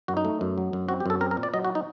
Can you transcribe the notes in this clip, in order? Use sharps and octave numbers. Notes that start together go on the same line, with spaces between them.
F#2 F#4
D#4
A3
F#2
F#3
F#2
C4 F#4
G4
F#2 A4
C4 A#4
A#4
A#2
D5
F#3 D#5
F#4
D#4